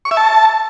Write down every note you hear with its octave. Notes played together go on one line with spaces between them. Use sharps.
C#6
E5
A5